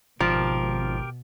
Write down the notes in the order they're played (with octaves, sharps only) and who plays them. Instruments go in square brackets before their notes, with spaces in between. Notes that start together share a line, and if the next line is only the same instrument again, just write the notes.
[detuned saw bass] G#1 [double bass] B2 [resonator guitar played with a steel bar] F3 [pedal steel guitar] G4 A#4